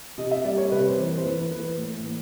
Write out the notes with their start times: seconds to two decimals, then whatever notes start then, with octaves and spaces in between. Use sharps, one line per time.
0.18 C3 D#5
0.31 E5
0.45 G3 D5
0.58 C#5
0.71 C3 B4
0.89 C5
0.98 E3
1.07 B4
1.18 C5
1.24 E3 B4
1.51 E3 B4
1.77 A2
2.04 A2